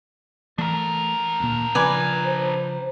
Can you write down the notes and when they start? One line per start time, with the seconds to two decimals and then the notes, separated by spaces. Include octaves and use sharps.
0.58 E3 A3 D4 A#4
1.40 D2 A#2
1.75 C#3 F3 B4 D5 G#5
2.25 C5